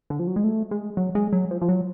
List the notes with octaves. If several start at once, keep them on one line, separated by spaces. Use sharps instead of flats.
D3
F3
F#3
G#3
A3
G#3
F#3
G#3
F#3
F3
F3
F#3